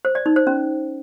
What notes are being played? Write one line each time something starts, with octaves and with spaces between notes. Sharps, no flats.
C5
D5
D#4
C5
C#4